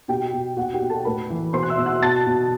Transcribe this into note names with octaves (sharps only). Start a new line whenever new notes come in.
B2 G4 G5
B2
B2 F#4 F#5
G4 G5
B2
A4 A5
A2 B4 B5
E3
B2 C5 C6
F#6
E5 E6
B2
F#5 F#6
B2 A5 A6
B2